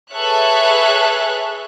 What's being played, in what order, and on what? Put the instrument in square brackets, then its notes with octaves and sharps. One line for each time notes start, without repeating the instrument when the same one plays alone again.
[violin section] G#4 A4 B4 C#5 E5 F#6